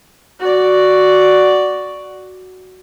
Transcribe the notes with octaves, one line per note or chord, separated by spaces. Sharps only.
F#4 D5